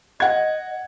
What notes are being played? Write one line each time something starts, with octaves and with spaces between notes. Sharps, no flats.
D#5 F#5 G#6